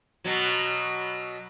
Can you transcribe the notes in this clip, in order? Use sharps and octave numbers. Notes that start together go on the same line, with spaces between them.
B2 F#3